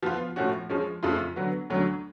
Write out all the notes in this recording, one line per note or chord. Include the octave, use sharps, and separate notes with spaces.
F3 B3 F4
A2 F3 A3 C#4 F#4
F3 G#3 C#4
F2 C#3 F3 A3 F4
D3 F#3 B3 F#4
D2 D3 F#3 C#4